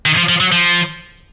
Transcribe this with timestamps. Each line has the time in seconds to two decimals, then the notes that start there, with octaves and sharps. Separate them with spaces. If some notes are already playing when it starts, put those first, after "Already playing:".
0.06 D#3
0.17 F3
0.29 F3
0.41 F#3
0.52 F3